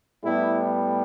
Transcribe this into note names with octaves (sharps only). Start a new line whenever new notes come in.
A2 G3 B3 E4